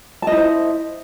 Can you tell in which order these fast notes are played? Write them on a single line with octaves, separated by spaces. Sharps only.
A5 D#5 E4 C5